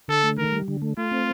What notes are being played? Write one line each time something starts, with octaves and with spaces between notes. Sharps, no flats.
D3 A4
A3
D#3 A#4
G3
D3
A3
A3 F4
C4